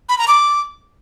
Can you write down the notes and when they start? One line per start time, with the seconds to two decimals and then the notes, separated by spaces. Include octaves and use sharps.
0.09 B5
0.18 A#5
0.28 D6